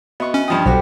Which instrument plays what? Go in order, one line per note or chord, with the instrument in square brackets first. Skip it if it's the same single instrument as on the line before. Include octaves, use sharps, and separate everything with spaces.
[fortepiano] B3 C#6 [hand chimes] F#4 D#5 E5
[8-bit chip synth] C#4
[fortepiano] G2 F3 D#6 [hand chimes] G5 B5
[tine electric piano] B1 [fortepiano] F#4 G4 [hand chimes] A4 C5